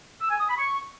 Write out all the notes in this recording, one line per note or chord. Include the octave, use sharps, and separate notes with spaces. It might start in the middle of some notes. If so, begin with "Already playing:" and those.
E6
G#5
D#6
B5
C#6